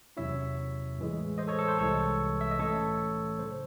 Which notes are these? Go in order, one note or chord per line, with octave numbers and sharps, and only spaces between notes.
E2 C3 F#3 C#4 E4 C#5 E5
A2 E3 G#3
C5 D#5
A4 C#5
A4
C5
C2 C3 E3 G#3 A4 C#5
E5
D#5
A2 E3 A3 C#4 A4 C#5
C#3 F#3 C5